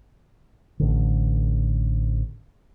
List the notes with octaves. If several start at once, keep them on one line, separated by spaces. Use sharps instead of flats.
A1 D3